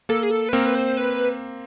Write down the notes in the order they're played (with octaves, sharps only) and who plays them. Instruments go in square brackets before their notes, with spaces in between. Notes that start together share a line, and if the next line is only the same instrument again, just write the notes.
[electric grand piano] A#3 [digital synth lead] A4
[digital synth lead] G#4
A4
B4
[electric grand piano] A#3 C4 [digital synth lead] A#4
[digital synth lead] B4
C5
B4